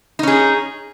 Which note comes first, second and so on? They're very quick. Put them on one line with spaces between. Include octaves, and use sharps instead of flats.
D#4 C#4 G#4